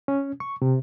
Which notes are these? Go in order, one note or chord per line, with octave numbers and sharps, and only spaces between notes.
C#4
C#6
C3